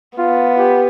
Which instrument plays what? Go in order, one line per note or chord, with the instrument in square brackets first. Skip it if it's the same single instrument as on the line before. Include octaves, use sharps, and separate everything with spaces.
[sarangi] B3 [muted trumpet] F4
[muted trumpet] G4